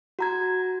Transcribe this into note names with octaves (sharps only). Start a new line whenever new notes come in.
F#4 A#5 G#6